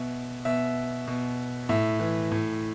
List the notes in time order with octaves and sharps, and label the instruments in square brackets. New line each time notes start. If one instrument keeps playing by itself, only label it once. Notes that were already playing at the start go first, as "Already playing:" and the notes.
Already playing: [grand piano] B2 E5
B2 E5
B2
A2 E5
E3
A2